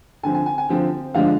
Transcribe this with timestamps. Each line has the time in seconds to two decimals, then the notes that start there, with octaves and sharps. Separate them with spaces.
0.23 D3 G#5
0.26 F3 C4
0.35 G#5
0.46 G#5
0.58 G#5
0.69 D3 F3 C4 G5
1.14 D3 F3 G#3 D4 F5